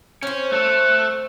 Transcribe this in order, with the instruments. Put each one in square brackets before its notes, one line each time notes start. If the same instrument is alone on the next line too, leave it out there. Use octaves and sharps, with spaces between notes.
[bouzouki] C4 C5 [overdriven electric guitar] C#4
[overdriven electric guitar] A3 A4 [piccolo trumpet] F#6